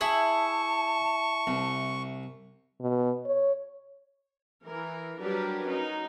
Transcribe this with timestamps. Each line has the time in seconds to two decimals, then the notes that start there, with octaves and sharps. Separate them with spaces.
0.01 E4 G#4 A5 C#6
1.47 C2
2.81 B2
3.25 C#5
4.65 E3 A#4
5.19 F#3 G3 D4 G4 A#4 B4
5.66 C#4 D#4 F#4